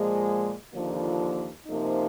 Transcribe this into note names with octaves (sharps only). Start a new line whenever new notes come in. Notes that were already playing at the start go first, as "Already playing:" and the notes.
Already playing: A#2 F3 G#3
D#2 D3 F3 A#3 F4
C3 F3 A#3 D#4